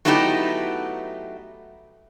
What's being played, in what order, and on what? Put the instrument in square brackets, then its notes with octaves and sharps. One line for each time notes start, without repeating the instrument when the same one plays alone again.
[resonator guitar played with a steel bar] F#3 A3 B3 D#4 E4 G4